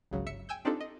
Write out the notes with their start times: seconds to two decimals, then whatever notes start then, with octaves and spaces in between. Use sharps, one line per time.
0.11 G#1 C#2 C#3 F#3
0.26 G1 E5 C#7
0.49 G5 G#5 E6 G6
0.65 C4 D4 D#4 F4 G4 A4
0.81 D#5